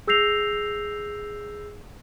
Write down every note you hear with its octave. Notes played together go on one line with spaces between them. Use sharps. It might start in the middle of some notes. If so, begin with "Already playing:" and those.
G#4 E6 G6 A#6 C7 F7